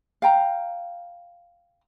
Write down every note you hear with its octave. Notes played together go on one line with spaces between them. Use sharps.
F5 G5 A#5